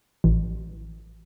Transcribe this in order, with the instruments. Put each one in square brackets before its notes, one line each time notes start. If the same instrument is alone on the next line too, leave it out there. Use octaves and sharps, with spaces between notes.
[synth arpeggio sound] A1